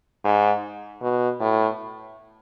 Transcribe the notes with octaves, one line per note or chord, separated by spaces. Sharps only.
G#2
B2
A2